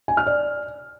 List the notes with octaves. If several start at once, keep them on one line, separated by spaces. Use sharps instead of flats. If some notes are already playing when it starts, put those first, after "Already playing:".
G#5
F6
D5